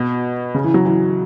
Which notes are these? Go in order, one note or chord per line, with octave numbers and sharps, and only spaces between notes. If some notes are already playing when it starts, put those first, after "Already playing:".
Already playing: B2
C#3
E3
F#3
E3